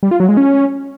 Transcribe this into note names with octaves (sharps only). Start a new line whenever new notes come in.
G3
F4
F#3
G#3
C#4